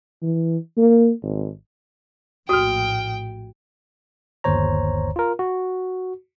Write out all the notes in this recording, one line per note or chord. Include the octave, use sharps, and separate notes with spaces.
E3
A#3
G#1
A#1 A2 F#4 G5 D#6 F6
G1 D#2 C5 C#5 A#5
F4 A#4
F#4